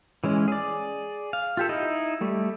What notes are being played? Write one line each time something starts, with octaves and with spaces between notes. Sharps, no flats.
E3 G#3 C#4
G#4 D5
F5
F4 G4 A4
D#4 E4 D#5
G3 A3